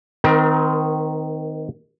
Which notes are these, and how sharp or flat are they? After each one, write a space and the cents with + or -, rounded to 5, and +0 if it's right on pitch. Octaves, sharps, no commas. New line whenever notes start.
D#3 +0 C4 -30 A#4 +30